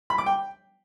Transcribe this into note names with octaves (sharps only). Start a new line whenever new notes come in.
B5
D6
G5